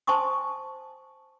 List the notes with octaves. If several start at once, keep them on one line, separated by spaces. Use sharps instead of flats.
C5 G#5 A5 C6 C#6 D#6